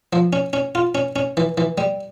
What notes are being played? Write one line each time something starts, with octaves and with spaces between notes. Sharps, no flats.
F3
C#4
C#4
F4
C#4
C#4
E3
E3
G3